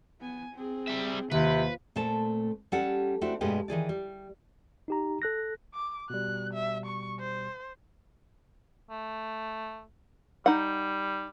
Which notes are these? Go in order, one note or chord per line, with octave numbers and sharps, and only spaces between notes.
B3 G#5
C4 G#4
G3 E5
D#2 C3 F4 B4 C5
A#2 A3 C4 A5
G3 C#4 G4 A4 F#5
A3 C4 D4 E4 F#4
G2 B2 G#3 A3 G4 B4
D#3 E3 G#4 D5
G3
D#4 G4 A#5
A4 F#6 A#6
D6
B2 G3 F#6
E5
C#6
C5
A3
G3 D#4 F#5